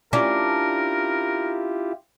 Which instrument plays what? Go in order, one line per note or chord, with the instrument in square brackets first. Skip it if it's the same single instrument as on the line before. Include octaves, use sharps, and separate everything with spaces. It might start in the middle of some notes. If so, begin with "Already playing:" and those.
[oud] C#4 D4 [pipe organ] E4 F4 G4 [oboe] A#4